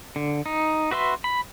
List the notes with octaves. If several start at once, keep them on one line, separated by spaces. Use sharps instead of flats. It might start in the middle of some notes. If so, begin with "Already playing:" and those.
D3
D#4
F#4 B4 E5 C6
B5